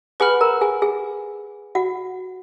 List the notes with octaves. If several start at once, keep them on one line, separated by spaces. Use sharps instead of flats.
G#4 B4 F#5 G#5 B5 F6
A#4 A#5
G#4 G#5
G#4 G#5
F#4 F#5